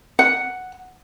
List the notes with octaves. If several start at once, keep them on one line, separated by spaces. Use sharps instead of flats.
F#5